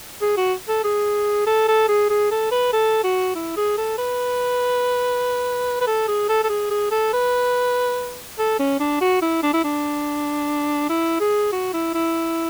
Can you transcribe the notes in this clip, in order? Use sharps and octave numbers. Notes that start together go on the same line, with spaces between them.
G#4
F#4
A4
G#4
A4
A4
G#4
G#4
A4
B4
A4
F#4
E4
G#4
A4
B4
B4
A4
G#4
A4
A4
G#4
G#4
A4
B4
A4
C#4
D4
F#4
E4
D4
E4
D4
E4
G#4
F#4
E4
E4